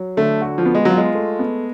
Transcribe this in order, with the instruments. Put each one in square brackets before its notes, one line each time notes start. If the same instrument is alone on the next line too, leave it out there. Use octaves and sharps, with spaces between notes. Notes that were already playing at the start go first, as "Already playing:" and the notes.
Already playing: [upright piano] F#3
[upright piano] D3 [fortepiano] A3
[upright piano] F#4
[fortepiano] F3
[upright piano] B3
[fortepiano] G#3
[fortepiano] F#3 [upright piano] F4
[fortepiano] G#3
[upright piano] A3
B3